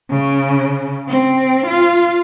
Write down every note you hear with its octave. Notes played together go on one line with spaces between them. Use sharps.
C#3
C4
F4